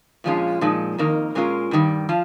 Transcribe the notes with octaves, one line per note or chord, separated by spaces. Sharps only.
A#2 F3 G#3 C#4 F4
A#2 F3 G#3 D#4
F2 D#3 A#3 D#4 A#4
A#2 G#3 C#4 F4 A#4
G2 D#3 G3
F3 F4